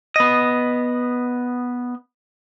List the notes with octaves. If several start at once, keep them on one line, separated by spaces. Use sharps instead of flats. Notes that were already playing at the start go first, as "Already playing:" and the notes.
B3 D#5